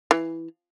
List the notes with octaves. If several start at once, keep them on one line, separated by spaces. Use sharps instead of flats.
E3